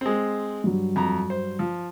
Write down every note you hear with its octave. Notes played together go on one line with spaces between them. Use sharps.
G#3 C4
G2 F#3
F2 A#5
C5
F3